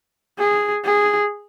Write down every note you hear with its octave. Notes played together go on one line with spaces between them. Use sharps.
G#4
G#4